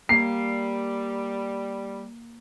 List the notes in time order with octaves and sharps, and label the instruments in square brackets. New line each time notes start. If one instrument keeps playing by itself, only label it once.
[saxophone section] G3 [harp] A#3 [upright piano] C7